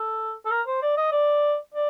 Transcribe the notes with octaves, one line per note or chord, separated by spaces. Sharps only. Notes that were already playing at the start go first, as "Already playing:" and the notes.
Already playing: A4
A4
A#4
C5
D5
D#5
D5
D5